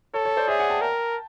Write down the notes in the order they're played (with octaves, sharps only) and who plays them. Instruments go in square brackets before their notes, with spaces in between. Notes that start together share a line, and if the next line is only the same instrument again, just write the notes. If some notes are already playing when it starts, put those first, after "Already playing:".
[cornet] A4 [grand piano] C#5
[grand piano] C#5
C5 D5
[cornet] G#4 [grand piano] D5 E5
[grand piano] F#5 G#5
G5 A5
[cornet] A#4